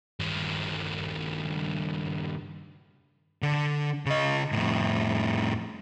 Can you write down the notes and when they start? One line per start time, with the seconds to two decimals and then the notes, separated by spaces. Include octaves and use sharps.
0.20 G2 D#3
3.42 D3
4.06 C#3 D#5
4.52 F2 A2